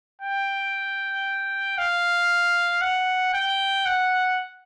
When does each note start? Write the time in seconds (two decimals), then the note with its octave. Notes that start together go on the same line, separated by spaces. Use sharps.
0.22 G5
1.78 F5
2.81 F#5
3.34 G5
3.86 F#5